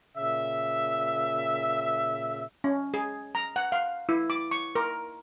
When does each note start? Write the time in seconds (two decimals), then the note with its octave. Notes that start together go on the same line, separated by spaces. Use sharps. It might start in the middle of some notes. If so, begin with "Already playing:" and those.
0.17 A#2 C#3 E5
2.64 C#4
2.94 G#4
3.35 A#5
3.56 F#5
3.72 F5
4.09 E4
4.30 D6
4.51 C#6
4.75 A#4